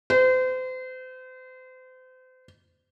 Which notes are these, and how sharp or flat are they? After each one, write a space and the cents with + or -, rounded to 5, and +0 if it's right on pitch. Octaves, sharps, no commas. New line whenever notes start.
C5 -35